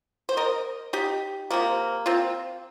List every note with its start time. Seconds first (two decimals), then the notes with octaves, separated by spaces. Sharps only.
0.29 C5
0.37 A#4 D#5
0.93 D#4 G4
1.51 C3 F3 A#3
2.06 C4 F4